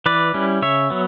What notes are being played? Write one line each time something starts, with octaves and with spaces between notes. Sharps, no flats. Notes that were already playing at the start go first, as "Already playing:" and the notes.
E3 B4 D5
G3 C#4 E4
C#3 C#5 E5
F#3 B3